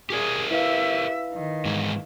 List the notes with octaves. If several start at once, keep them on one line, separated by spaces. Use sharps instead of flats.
G4 G#4 A#4 D5
E4 B4 E5 F5
D#3
G#2 E3 G#3